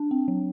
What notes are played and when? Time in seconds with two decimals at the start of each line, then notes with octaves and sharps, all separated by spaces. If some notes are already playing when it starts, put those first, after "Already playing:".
Already playing: D4
0.11 C4
0.28 F#3